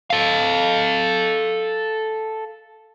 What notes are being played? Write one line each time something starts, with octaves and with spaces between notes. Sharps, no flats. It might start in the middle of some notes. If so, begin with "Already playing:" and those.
A4 F5